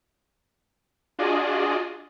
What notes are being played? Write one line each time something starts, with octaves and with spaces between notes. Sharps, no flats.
D4 F4 F#4 G#4 D5 D#5